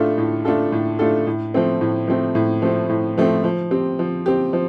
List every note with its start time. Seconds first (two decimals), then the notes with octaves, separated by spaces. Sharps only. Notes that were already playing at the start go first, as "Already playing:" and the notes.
Already playing: A2 A3 D4 F4 A4
0.18 A2
0.45 A3 D4 F4 A4
0.72 A2
0.99 A3 D4 F4 A4
1.27 A2
1.54 F3 A3 C4
1.81 A2
2.08 F3 A3 C4
2.35 A2
2.62 F3 A3 C4
2.89 A2
3.18 F3 A3 C4
3.44 F3
3.71 C4 G4
3.99 F3
4.26 C4 G4
4.53 F3